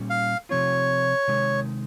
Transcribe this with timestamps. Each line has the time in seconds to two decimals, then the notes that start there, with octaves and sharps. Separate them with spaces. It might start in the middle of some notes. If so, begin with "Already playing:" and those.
Already playing: A#2 G3 C#4
0.10 F5
0.49 C3 F3 C4 F4 C#5
1.28 C3 D#3 G#3